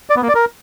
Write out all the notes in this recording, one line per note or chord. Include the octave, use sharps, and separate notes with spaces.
D5
B3
A#3
D5
A#4